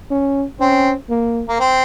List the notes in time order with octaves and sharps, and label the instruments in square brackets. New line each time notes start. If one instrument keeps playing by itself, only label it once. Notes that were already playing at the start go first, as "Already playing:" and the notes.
[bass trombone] C#4
[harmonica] C4 [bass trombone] C#4
[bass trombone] A#3
[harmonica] A#3
C4